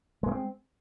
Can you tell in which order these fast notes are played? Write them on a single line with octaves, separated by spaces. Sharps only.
G#3 A3 C4